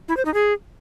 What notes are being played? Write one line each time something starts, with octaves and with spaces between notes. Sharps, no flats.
E4
C5
D#4
G#4